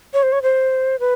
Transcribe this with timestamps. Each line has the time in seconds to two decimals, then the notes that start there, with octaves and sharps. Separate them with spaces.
0.13 C#5
0.23 C5
0.32 C#5
0.42 C5
1.00 B4